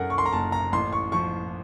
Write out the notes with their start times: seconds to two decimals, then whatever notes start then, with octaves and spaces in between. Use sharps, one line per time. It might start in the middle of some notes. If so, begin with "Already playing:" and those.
Already playing: F#2 A4 A#4 F#5
0.10 C#6
0.18 C6
0.26 A#5
0.33 F#1 A5
0.52 A#5
0.72 A1 C6
0.93 C#6
1.12 F3 C#6